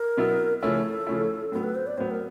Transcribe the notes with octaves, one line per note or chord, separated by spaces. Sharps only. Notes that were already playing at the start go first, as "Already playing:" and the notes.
Already playing: A#4
B2 F#3 B3 E4
C#3 F3 A3 C#4 E4 A4
C#3 F3 A3 C#4 E4
A2 F#3 B3 A4
B4
C5
D5
A2 F#3 B3 C5
A#4